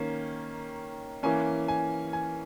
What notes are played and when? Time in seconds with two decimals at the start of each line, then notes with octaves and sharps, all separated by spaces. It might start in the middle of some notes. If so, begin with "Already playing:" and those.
Already playing: D#3 A#3 C#4
1.23 E3 A#3 C#4 G#5
1.68 G#5
2.13 G#5